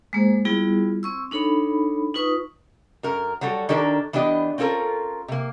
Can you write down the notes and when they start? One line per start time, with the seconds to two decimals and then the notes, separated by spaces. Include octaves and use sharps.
0.13 G#3 A#3 G#4 C5
0.45 G3 B3 E4 F4 G#4
1.03 C4 C#6 E6
1.31 D4 D#4 A4 C#5 B5
2.14 D#4 F4 B4 C#6 D#6
3.03 F#2 A#4
3.41 F#3 G3 F#4 A4
3.69 D#3 D4 G4 A4 A#4
4.13 E3 B3 D4 G4 D#5
4.58 C4 C#4 F4 A4 A#4
5.28 C3 A#3